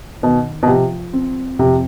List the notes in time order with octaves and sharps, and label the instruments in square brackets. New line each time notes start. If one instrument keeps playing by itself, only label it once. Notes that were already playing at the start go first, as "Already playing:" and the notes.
[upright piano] B2 [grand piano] D#3
[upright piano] B2
[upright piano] C3 [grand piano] F3
[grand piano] C4
[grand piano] F2 [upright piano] C3